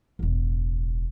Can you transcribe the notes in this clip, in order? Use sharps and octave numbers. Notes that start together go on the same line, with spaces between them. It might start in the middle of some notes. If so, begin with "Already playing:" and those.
E1 A1